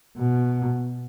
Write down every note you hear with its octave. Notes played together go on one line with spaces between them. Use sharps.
B2